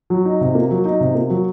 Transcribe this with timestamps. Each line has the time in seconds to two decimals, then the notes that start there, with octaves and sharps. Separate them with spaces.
0.10 F#3
0.25 D#4
0.41 C3
0.55 A#3
0.71 F#3
0.85 D#4
1.01 C3
1.15 A#3
1.30 F#3